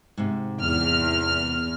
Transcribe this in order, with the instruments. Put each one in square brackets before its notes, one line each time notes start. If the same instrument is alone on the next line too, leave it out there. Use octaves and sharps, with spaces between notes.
[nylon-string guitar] G#2 C3
[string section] E2 F6